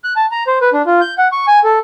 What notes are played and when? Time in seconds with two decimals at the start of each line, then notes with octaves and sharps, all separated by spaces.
0.04 F#6
0.16 A5
0.31 A#5
0.47 C5
0.62 B4
0.73 D4
0.86 F4
1.01 G6
1.18 F#5
1.32 C#6
1.47 G#5
1.64 A4